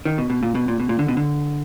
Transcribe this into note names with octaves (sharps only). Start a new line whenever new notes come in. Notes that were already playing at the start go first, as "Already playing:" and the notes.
D#3
B2
B2
A#2
B2
A#2
B2
A#2
D3
B2
D3